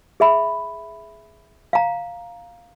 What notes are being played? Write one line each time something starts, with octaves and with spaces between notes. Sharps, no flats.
G#4 E5 B5
F5 A#5